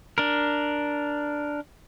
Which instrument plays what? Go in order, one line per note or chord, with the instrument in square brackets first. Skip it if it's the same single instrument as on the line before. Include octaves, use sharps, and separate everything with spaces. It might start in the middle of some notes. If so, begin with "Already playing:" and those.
[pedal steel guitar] D4 A#4